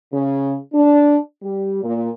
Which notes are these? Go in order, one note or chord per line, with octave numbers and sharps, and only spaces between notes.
C#3
D4
G3
A#2